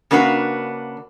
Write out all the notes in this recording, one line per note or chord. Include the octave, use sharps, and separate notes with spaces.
C#3 A#3 D4 F#4 B4